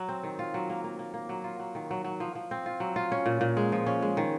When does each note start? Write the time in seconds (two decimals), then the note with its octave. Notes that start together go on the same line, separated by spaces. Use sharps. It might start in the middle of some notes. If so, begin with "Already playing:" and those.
Already playing: F#3
0.09 C4
0.23 D#3
0.39 F4
0.54 F#3
0.69 A#3
0.84 A#3
0.99 A#3
1.14 A#3
1.29 F#3
1.44 F4
1.60 F#3
1.75 D#3
1.91 F#3
2.05 F#3
2.20 F3
2.35 F3
2.51 C4
2.66 F4
2.80 F#3
2.96 F4
3.12 C#4
3.26 A#2
3.41 A#2
3.57 G#3
3.72 F3
3.86 C#4
4.02 G#3
4.17 D#3